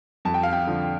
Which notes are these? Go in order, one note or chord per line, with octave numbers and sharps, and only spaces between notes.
F2 A5
G5
F5
G5
D3 F3